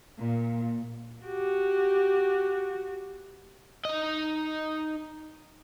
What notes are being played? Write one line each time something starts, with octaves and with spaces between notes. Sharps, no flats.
A#2
F#4 G4
D#4 D#5